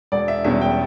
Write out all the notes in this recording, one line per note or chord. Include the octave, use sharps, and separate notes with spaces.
E1 D5
E5
E2 B2 G3 C#4 E5
G5